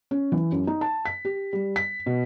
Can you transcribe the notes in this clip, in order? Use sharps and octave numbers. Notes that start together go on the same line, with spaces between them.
C#4
E3
F#2
D#4
A5
B6
G4
G3
B6
B2